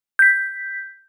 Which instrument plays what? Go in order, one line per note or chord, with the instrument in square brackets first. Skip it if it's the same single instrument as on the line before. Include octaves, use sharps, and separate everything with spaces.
[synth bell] G6 B6